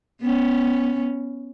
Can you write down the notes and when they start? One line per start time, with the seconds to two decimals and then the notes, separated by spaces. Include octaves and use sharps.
0.21 B3 C#4